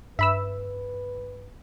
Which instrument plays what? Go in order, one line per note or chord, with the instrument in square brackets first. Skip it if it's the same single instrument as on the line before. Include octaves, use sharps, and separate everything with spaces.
[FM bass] G2 [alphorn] B4 [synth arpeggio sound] E5 B5 E6